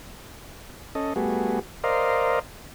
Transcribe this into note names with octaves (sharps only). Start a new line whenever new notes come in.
C#4 A4 D#5
G3 A3 B3 F#4 G#4
A#4 C5 D5 D#5 F5